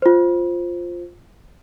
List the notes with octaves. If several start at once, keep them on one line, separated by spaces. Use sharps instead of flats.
F4 C5